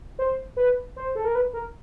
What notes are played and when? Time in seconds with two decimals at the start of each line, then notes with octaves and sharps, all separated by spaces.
0.19 C5
0.57 B4
0.96 C5
1.15 A4
1.25 A#4
1.35 B4
1.53 A#4